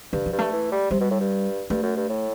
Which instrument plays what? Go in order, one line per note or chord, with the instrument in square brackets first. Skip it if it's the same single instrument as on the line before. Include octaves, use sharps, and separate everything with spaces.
[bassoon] G2 [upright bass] D3
[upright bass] F#3
[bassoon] G2
[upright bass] A3
[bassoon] E3
G3
[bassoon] C3 [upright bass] G3
[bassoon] B2
A2
G2
[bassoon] G2 [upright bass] A3
[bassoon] F#2
G2
A2